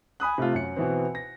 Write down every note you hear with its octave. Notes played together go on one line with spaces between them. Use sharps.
G#5 B5 D#6 F#6
C3 A3 F4
F#2 C#7
B2 E3 B3 C4
A#6